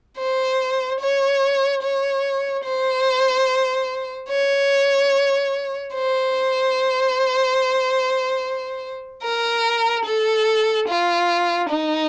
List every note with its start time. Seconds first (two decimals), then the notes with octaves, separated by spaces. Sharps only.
0.18 C5
1.01 C#5
1.83 C#5
2.65 C5
4.29 C#5
5.94 C5
9.23 A#4
10.06 A4
10.88 F4
11.69 D#4